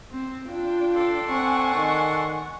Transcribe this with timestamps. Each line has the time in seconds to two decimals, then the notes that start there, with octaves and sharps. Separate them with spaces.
0.11 C4
0.47 D4 F4 G5
0.95 A4 D5 C6
1.30 C4 F#5 G#5 C#6
1.75 D#3